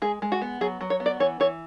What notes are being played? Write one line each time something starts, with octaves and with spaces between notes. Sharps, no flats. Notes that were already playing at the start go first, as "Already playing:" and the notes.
G#3 G#4
G#3
F#4
B3
F#3 G#4
F#3
C#5
B3
D5
E3 C#5
E3 C#5